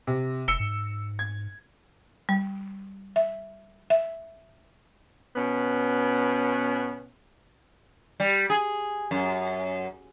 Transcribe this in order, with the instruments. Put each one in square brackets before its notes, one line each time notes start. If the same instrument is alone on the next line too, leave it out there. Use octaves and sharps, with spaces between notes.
[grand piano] C3
[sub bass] E1 [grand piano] E6 C#7 G7
[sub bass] G#2
[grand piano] G#6
[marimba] G3
E5
E5
[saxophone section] B2 B3 C#4
[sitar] G3
G#4
F#2